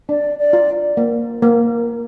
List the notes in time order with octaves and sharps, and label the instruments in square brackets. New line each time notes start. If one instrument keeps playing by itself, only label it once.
[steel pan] D4 [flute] D5
[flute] D5
[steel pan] F4
A#3
A#3